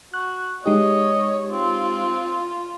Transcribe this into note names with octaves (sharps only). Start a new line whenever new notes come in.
F#4 F#6
G#3 D#4 G4 C#5 D#5
C4 F4